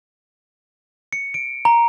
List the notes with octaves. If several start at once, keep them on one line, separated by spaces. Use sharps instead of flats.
C#7
D7
A#5